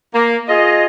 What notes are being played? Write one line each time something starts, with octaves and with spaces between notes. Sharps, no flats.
A#3
F4 G#4 D#5